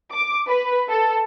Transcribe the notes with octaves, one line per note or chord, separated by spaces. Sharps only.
D6
B4
A4